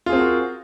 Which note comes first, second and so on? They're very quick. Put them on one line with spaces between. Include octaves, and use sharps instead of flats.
F4 G#4 C4 A#4 F#4